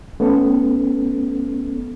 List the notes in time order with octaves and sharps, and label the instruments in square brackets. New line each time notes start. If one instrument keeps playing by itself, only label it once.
[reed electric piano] A3 B3 C#4 A4